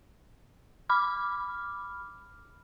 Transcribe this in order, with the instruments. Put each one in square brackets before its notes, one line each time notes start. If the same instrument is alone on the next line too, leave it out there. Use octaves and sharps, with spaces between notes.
[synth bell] B5 D6 F6